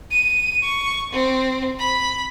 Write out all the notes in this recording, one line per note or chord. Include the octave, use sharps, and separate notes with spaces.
D#7
C#6
C4
B5